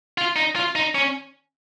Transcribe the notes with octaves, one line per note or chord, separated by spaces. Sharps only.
F4
D#4
F4
D#4
C#4